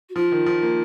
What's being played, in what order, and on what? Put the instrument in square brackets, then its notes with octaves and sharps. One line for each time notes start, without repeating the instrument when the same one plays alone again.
[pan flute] F#4
[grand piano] F3 [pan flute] F4
[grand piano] D#3
F3
A#3